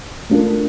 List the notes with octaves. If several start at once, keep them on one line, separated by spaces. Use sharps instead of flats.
A3 D4 F4 A#4